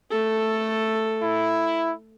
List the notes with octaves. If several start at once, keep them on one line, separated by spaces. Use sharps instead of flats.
A3 A4
E4